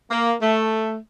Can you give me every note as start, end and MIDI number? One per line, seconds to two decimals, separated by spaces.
0.11 0.33 58
0.42 0.96 57